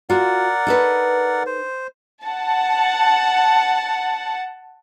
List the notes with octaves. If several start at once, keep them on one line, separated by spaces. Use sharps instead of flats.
F4 F#4 A#4 D5 F#5
D#4 A4 B4
C5
F#5 A5